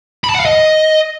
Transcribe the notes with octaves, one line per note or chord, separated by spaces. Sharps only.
B5
A5
F#5
F5
D#5